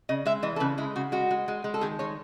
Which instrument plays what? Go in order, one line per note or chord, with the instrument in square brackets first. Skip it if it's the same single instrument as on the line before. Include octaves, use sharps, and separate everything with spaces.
[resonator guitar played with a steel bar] C#3 D#5
G#3 E5
E3 D#5
A4
C#3 B4
G#3 E4
C#3 F#4
G#3 F#4
G#3
G#3
G#3
A4
D#3 G#4
G#3 C#5